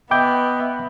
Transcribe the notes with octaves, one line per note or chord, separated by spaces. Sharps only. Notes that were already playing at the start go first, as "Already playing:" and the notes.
B3 D#5 E5 G5 B5 D6 G6